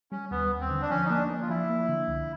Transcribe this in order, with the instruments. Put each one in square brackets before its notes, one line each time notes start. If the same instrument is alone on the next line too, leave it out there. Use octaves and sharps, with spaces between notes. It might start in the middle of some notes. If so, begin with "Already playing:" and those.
[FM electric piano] G3 [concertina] C#4
[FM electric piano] D#2 [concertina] B3
[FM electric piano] D#2
[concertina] C4
[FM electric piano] D3
[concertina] D4
[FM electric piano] F3 [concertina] C#4
[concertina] D#4
[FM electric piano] A#3 [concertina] D4
[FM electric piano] A#3
[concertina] F4
[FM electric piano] F3 [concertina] E4
[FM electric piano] A#3
D3
C2